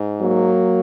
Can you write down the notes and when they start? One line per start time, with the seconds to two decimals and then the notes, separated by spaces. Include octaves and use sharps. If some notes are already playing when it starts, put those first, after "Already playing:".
Already playing: G#2
0.21 F#3 A#3